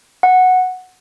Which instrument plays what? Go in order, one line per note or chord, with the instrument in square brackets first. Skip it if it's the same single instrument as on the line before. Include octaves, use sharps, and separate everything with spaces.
[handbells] F#5